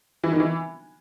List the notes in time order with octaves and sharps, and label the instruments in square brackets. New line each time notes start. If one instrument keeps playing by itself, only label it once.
[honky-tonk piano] E3
D#3
E3